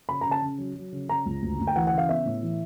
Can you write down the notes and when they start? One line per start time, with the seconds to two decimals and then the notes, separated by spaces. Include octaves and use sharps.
0.09 C#3 B5
0.21 C#3 A#5
0.31 A5
0.42 C#3
0.58 F#3
0.75 F#3
0.92 C#3
1.09 C#3 A#5
1.26 C#2
1.42 D2
1.59 D2
1.67 G5
1.76 E3 F#5
1.87 F#5
1.93 C#3 F5
2.09 B3 E5
2.25 A2
2.43 E3